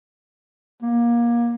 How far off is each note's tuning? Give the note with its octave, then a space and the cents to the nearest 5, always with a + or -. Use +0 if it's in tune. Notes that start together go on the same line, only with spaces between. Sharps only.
A#3 +25